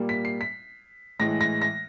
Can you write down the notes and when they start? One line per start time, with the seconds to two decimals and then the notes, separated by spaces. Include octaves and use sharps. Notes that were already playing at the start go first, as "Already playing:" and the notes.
Already playing: A#2 G3 A#3
0.09 B6
0.25 C7
0.41 B6
1.19 A2 E3 G#3 A#6
1.41 A#6
1.62 A#6